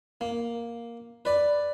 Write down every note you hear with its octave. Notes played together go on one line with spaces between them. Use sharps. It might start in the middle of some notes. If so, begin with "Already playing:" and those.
A#3
B4 D5